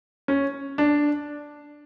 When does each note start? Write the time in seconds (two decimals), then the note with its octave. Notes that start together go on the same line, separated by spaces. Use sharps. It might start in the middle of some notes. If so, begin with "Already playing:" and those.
0.28 C#4
0.78 D4